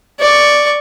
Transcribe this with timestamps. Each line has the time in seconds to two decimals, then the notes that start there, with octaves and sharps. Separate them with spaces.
0.20 D5 C#6